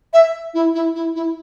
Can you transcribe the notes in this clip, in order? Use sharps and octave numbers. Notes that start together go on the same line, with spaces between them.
E5
E4
E4
E4
E4